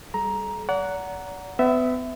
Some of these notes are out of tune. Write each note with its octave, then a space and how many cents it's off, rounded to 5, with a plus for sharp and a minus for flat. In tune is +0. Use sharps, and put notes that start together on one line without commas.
G3 +0 A4 -40 A#5 +10
D5 -40 F#5 +0 A#5 +0
B3 +35 E5 +0